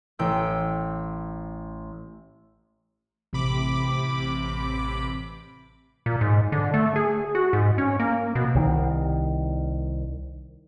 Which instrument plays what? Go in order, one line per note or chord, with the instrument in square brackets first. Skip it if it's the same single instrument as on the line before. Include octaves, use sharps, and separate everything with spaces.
[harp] A1 G5 E6
[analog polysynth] A1 C3 B5 D6
[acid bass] A#2
G#2
D3
A3
G#4
F#4
G#2
C#4
A#3
B2
[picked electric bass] C2 D#3